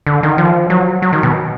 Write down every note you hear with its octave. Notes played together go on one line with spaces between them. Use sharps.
D3
D#3
F3
F#3
F#3
D#3
B2